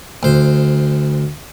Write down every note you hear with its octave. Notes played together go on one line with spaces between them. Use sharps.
D2 C5